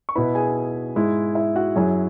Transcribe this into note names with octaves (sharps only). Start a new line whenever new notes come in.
C#6
B2 B3 E4 B4 B5
G#4 G#5
G#2 G#3 E4
E4 E5
F#4 F#5
F#2 F#3 E4 G#4 G#5